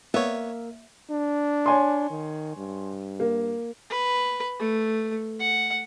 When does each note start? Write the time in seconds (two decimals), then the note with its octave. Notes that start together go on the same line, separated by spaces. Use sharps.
0.14 A#3 B3 C#5 E5
1.11 D4
1.66 C#5 G#5 C6
2.10 D#3
2.57 G2
3.20 A#3
3.90 B4
4.59 A3
5.40 F#5